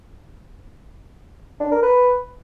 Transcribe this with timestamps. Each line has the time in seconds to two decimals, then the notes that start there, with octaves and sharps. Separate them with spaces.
1.60 D4
1.71 A#4
1.83 B4